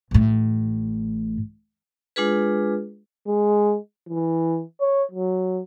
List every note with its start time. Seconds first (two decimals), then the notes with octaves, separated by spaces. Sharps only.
0.11 A1 A2
2.16 G#3 D4 F4 G#4 B4
3.27 G#3
4.09 E3
4.80 C#5
5.12 F#3